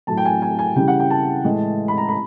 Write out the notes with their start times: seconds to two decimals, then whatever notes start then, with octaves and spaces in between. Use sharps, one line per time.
0.07 A2 F#3 A3 A5
0.17 G5
0.25 G#5
0.42 G#5
0.59 G#5
0.76 C#3 E3 G3 G5
0.88 F#5
1.00 G5
1.10 A5
1.45 A2 E3 G#3
1.88 B5
1.98 A#5
2.09 B5